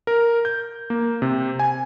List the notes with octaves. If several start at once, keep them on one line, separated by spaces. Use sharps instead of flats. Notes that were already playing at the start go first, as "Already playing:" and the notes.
A#4
G6
A#3
C3
G#5